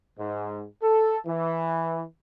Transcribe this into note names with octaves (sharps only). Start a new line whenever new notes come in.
G#2
A4
E3